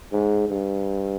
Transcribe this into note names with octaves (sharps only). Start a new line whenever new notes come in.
G#2
G2